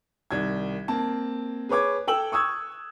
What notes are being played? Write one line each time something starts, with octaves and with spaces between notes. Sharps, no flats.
C2 D#3 G#6
A#3 C4 A5
G#4 B4 C#5 D6 G#6
A4 G5 E6 F#7
C#6 D#6 E6 G#6